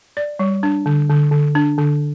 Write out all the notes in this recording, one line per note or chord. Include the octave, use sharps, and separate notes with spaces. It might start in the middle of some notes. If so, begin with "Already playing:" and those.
D5
G3
D4
D3
D3
D3
D4
D3